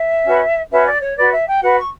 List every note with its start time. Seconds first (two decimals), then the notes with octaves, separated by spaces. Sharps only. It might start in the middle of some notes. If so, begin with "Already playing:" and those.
Already playing: E5
0.24 C#4 F#4 B4
0.70 C#4 F#4 B4 E5
0.86 D5
1.01 C#5
1.16 F#4 B4 D5
1.30 E5
1.46 G5
1.61 F#4 B4 F#5
1.77 C#6